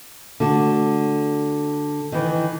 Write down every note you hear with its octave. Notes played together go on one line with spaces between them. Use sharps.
D3 A3 F#4
D#3 E3